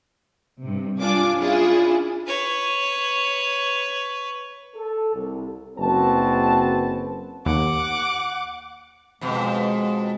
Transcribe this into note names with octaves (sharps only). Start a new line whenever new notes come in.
G2 C3
G3 D4 F4 G#5 D6
C#4 D4 E4 F4 G#4
B4 C#5
A4
C2
F#1 C4 F#4 B4 A5
D#2 F#5 D6
F2 B2 G#3